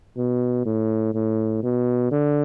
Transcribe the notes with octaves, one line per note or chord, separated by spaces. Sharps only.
B2
A2
A2
B2
D3